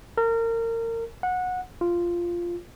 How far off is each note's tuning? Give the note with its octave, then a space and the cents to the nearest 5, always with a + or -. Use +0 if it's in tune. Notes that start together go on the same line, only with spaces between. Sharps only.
A#4 -30
F#5 -20
F4 -10